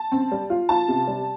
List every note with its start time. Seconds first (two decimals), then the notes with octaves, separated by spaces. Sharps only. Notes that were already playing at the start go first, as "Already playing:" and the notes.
Already playing: A5
0.12 C4
0.32 G3
0.50 F4
0.69 F4 A5
0.88 C3
1.07 G3